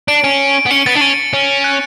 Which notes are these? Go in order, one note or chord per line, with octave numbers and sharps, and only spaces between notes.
D4 D7
C#4
B3
C#4 C#7
B3 A6
D4
C#4
C#4
F#6